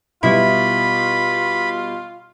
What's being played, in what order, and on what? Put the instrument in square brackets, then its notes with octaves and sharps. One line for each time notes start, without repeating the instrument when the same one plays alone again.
[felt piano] B2 G3 B3 [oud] E4 [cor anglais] F4 [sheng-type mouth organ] B5